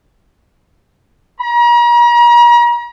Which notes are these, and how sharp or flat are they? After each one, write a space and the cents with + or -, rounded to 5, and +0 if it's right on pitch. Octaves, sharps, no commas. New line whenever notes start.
A#5 +40